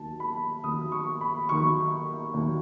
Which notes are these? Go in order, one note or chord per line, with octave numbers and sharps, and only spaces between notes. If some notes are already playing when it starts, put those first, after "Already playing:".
Already playing: D#2 D#3 F#3 A5
B5
D#2 D#3 F#3 D#6
C#6
B5
D#2 D#3 F#3 C#6
D#2 D#3 F#3